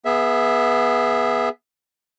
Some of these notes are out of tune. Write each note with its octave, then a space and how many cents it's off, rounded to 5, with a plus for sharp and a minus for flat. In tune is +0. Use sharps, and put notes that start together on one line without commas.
B3 -20 G#4 +0 E5 +0